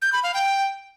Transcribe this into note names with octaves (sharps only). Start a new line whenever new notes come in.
G6
B5
F5
G5